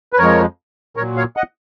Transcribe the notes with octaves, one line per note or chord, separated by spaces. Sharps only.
B4
F2 F3 G#3 A#4 C#5
A#2 F#3 A#4 C#5
C#5 F5
D#5 F#5